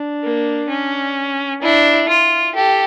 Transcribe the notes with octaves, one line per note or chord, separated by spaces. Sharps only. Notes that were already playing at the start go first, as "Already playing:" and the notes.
Already playing: D4
A#3
C#4
D4 E4
F4
G4 A4